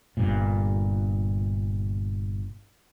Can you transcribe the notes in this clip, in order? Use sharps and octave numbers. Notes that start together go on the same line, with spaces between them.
G1 G2 A#2